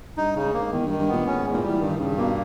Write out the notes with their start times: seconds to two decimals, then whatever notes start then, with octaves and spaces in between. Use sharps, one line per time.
0.17 G2 D#4
0.35 C#3
0.45 G#2
0.54 A#3
0.72 E2 D#3
0.86 G2 D#3
0.99 G2
1.08 A#2 B3
1.26 G#2 C#4
1.40 E2 G#2
1.54 A#2
1.63 E3 G3
1.81 G2 D#3
1.99 G2 C#3
2.17 B2 A#3